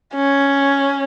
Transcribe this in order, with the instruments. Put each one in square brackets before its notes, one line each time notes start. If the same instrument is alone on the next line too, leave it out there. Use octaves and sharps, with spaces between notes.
[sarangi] C#4